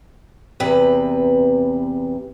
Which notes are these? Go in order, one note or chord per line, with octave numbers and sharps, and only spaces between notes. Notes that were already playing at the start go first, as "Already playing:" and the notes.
E2 C3 B4